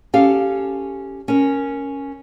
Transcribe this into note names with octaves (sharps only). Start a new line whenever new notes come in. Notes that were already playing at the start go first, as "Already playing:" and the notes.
C#4 G4 A4 F5
C#4 A#4